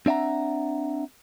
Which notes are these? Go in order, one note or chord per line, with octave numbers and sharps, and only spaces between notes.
C4 D4 E5 F#5 A#5